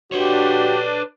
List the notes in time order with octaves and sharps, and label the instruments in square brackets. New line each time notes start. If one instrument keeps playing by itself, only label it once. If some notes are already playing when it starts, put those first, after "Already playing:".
[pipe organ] D4 [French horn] F#4 [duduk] G4 [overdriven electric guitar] B4 C#5